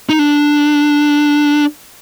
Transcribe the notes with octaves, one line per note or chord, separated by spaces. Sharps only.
D#4
D4